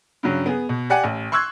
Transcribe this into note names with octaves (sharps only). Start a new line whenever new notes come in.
G2 C#3 F#3
B3 G#4
B2
G4 D5 F#5 G#5
A1
C6 C#6 E6 F#6 G#6